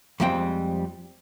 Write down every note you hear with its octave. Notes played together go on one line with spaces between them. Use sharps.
F2 G3 G#3 C4 G5